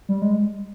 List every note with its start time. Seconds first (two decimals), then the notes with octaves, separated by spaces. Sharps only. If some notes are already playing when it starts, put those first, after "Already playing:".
0.09 G3
0.22 G#3